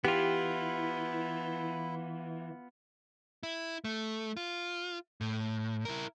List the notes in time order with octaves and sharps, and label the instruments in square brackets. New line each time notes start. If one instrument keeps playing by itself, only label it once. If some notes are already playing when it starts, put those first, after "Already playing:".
[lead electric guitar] E3 [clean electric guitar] B3 F4 [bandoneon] E4 [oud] G4
[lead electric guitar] E4
A3
F4
A2
E4 A#4